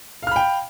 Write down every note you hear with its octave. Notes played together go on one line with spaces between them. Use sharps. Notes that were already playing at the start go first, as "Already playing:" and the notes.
F5 G5 B5 F6